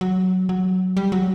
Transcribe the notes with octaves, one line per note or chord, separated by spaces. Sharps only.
F#3
F#3
G3
F#3